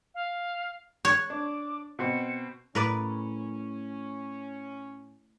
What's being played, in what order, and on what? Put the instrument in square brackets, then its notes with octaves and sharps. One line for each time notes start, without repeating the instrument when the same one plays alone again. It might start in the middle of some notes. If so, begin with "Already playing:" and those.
[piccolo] F5
[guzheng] C#5 [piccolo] F#6
[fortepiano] D4 [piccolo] D6
[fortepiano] B2 C4 [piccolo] C#7
[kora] A2 [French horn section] C#4 [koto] A#4 B4 D5